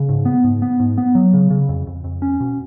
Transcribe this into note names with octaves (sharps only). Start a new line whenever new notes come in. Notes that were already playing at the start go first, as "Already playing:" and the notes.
Already playing: C#3
G#2
B3
G#2
B3
G#2
B3
F#3
C#3
C#3
F2
F2
F2
C#4
B2